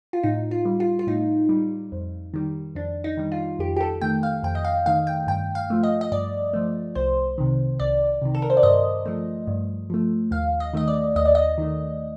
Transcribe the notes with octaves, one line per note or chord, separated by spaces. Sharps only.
F4
A2 D#4
F4
G3
F4
F4
A2 D#4
G3
F2
D#3 G3
F2 D4
D#4
D#3 G3
F4
F2 G4
G4
A4
D#3 A3 G5
F5
F2 G5
D#5
F5
D#3 A3 F5
G5
G2 G5
F5
F3 A3
D#5
D#5
G2 D5
F3 A3
C2 C5
C3 D#3
C2 D5
C3 D#3
A4
A#4
C5
D5
G2 D#5
F3 A3
G2
F3 A3
D#2 F5
D#5
D#3 A3 D#5
D5
D#2 D#5
D5
D#5
D#3 A3